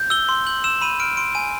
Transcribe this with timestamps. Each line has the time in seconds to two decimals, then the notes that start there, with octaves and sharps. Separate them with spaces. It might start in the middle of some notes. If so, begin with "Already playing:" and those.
Already playing: G6
0.10 E6 G7
0.29 C6
0.47 G6 F#7
0.64 E6 E7
0.81 B5 D#7
1.00 F6 D7
1.17 C6 D7
1.35 G#5 D#7